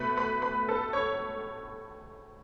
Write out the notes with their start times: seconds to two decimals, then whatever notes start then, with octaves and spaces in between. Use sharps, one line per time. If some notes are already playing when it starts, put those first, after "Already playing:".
Already playing: B2 A3 B4 B5
0.17 B4 B5
0.42 B4 B5
0.68 A4 A5
0.93 C#5 C#6